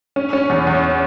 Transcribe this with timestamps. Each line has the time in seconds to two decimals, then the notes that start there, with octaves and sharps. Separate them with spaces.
0.16 C#4
0.33 C#4
0.49 E2
0.67 E2